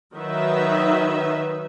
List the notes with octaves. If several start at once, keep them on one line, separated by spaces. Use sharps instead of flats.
D#3 F#3 D#4 B4 E5